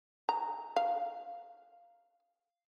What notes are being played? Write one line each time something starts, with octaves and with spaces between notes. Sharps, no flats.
A#5
F5